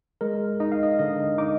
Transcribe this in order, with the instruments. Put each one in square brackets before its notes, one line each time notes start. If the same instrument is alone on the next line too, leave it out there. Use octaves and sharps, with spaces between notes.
[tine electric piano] G#3 A#4
D#4 D#5
F5
D#5
D3 D#5
D#4 D6